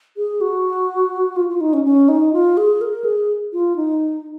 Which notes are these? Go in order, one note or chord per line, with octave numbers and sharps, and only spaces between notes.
G#4
F#4
F4
F4
D#4
C#4
C#4
D#4
F4
G#4
A#4
G#4
F4
D#4